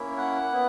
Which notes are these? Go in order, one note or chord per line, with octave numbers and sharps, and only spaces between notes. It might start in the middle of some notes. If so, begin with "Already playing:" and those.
Already playing: A#3 C#4 E4
F#5
B3 E4